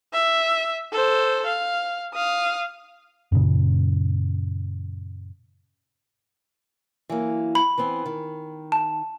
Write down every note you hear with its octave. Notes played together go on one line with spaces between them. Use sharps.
E5
A4 C5
F5
F5 D#6
F#2 A#2 C#3
E3 F#3 A#3
B5
E3 B3 C4
D#3
A5